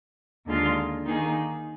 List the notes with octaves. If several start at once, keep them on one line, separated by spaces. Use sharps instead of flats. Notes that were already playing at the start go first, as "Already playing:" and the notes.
D#2 D3 G#3 D4 F4
D#3 A#3 D#4 G#4